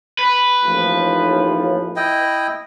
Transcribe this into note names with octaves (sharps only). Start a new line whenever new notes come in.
B4
A1 D#2 F3
E4 D#5 G5